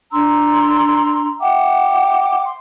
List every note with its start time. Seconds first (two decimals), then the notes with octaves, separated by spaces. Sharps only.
0.12 D4 A#5 C6 E6
1.40 E5 F#5 G5 D6
2.44 C6